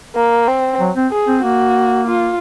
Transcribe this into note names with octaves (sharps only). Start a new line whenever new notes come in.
A#3
C4
F#3
C4
G#4
C4
A#3 F#4
F4